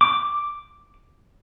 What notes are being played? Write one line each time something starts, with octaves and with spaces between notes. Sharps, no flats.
D6